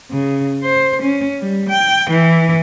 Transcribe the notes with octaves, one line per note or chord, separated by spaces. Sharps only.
C#3
C5
C#4
G3
G5
E3